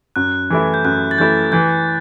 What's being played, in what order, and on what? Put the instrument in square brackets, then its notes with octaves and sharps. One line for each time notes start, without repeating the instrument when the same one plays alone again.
[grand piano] F#2 [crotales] F#6
[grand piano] E3 A3 E4
[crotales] G6
[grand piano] F#2 [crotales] F#6
[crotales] A6
[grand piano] E3 A3 E4 [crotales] G6
[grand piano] E3 [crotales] G6